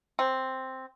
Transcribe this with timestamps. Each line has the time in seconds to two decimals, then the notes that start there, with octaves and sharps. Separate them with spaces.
0.19 C4